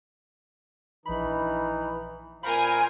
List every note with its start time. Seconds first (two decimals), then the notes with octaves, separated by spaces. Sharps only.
1.06 A#1 E3 D#4 B5
2.43 A#2 A#4 C5 F5 G#5 B5